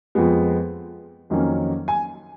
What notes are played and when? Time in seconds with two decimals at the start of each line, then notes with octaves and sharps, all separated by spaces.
0.15 F2 F3 G#3 B3
1.30 F2 D#3 F#3 A#3 C#4
1.88 G#5